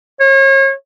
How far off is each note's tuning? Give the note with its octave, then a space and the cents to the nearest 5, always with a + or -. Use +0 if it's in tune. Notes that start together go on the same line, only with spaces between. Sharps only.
C#5 -35